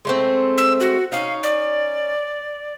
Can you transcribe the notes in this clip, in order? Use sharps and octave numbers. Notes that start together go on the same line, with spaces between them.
G#3 A3 C4
E6
F#4
C#4 D#4 F5
D5